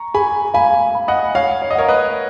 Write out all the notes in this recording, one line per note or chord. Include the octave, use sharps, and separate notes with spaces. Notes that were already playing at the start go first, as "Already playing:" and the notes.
Already playing: A#5 C#6
G#4 G#5 B5
F5 G#5 B5
B5
D#5 F#5
C#5 F5 F#5
C#5
D#5
A#4 C#5 F#5
B4 D#5